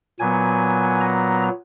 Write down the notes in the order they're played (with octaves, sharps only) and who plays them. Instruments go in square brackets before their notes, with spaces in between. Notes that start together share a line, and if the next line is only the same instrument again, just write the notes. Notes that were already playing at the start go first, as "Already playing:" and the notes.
[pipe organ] A#2 F#3 B3 G#5
A#5